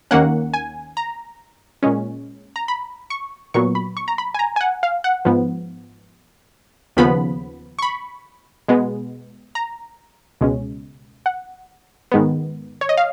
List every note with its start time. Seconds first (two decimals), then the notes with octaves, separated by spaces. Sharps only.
0.11 D#2 D#3 A#3 C#4 F#5
0.54 G#5
0.97 A#5
1.83 A#2 G#3 C#4
2.56 A#5
2.68 B5
3.10 C#6
3.54 A#2 F#3 B3 C#6
3.75 B5
3.97 C#6
4.08 A#5
4.18 B5
4.34 G#5
4.39 A#5
4.56 G#5
4.61 F#5
4.83 F5
5.04 F#5
5.25 G#2 F3 B3
6.97 D#2 C#3 F3 B3 B5
7.79 C#6
7.82 B5
8.68 B2 G#3 B3
9.55 A#5
10.41 C#2 B2 G#3 C#4
11.26 F#5
12.12 G#2 D#3 G#3 B3
12.81 C#5
12.89 D#5
12.97 F5